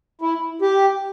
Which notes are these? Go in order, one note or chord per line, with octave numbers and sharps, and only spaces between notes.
E4
G4